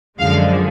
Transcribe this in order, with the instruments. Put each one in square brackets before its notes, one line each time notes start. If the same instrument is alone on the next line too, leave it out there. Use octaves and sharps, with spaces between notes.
[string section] F#2 D3 F3 G#3 F5